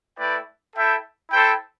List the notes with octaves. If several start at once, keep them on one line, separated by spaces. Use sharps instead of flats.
A3 E4 B4 D5 G5
E4 A4 E5 G5
E4 A4 C5 G5